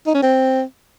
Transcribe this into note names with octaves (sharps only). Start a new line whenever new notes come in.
D#4
C#4
C4